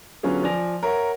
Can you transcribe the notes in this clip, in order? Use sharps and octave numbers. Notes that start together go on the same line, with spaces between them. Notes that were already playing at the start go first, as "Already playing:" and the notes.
D3 F#3 B3 C#4 F4 G#4
F3 D5 G#5 A#6 F7
A#4 C#5 E5 F#5